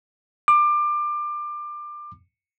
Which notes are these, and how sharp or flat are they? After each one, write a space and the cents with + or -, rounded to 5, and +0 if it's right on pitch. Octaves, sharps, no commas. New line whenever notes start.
D6 +25